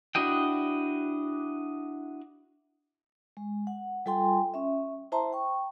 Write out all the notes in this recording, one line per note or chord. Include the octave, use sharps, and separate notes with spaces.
D4 E4 F#4 D#5 G5
G#3
F#5
G3 F4 A4 G5 G#5 C6
C#4 E5
E4 C5 E5 A5 A#5 C6
G5 C#6